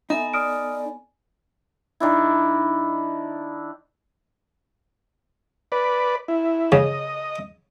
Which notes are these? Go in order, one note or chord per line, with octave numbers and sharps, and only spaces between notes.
B3 D#4 A4 E5 G#5
D5 D#6 F6 D7
D#3 D4 E4
B4 D5
E4
C#3 D#5